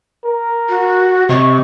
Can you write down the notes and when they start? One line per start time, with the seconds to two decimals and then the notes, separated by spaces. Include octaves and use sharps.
0.25 A#4
0.69 F#4
1.29 C3 D#5 C#6